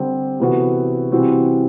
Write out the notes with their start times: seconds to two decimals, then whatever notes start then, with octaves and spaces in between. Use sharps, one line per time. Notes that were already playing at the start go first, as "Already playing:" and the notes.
Already playing: D3 G3 C4 G4
0.40 C3 E3 B3 F#4 A4
1.12 C3 E3 G3 C4 F#4